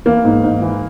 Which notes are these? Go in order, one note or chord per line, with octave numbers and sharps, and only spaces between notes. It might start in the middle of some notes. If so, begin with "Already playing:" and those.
E3 A#3
G#2
G#2
E3